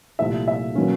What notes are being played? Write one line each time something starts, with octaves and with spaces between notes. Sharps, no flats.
C2 A#2 F3 A3 E5
E5
B2 F#3 A#3 C#4